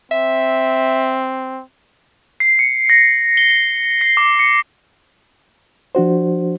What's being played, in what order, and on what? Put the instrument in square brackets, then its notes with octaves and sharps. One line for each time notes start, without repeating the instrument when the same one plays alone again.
[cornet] C4 [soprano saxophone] E5
[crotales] C7
C#7
A#6
G7
G7
C7
D6
C#7
[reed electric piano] F3 D4 F#4 C5